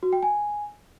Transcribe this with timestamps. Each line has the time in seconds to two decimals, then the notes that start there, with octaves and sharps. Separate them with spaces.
0.03 F#4
0.13 G5
0.23 G#5